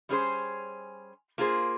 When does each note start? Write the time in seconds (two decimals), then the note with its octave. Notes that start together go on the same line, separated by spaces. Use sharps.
0.09 G3 C#4 G#4 C5
1.38 A#3 F4 G#4 C5